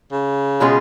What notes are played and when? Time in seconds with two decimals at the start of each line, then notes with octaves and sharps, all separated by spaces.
0.12 C#3
0.60 B2 G#3 C#4 F4 G#4